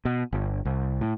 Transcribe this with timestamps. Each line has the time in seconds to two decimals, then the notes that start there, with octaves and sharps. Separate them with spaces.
0.05 B2
0.33 G1
0.65 C2
1.01 A2